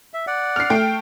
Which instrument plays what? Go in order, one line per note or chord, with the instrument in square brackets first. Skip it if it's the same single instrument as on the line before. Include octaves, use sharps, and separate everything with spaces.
[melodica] E5
D5 F#5
[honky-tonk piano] F6 C7
A3 G5